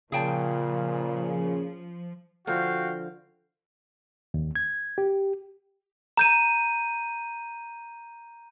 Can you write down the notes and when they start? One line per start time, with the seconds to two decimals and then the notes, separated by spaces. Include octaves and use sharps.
0.12 A#2 C#3 F3 G#4 G5 A5
2.47 D3 F3 F#4 F5 G5
4.34 D#2
4.56 G#6
4.98 G4
6.17 A#5 G6 D#7